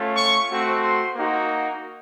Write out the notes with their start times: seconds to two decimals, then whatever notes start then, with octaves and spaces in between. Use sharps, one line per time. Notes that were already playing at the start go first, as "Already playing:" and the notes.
Already playing: A3 C#4 F4
0.17 C#6
0.50 A3 C4 F#4
0.83 C6
1.15 A#3 D#4 F#4